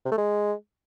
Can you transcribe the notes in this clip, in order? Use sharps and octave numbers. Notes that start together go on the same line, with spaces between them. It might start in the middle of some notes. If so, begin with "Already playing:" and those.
C3
A3
G#3